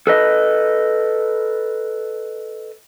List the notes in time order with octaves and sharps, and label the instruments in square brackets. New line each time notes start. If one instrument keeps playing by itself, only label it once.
[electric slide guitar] A4 B4 D#5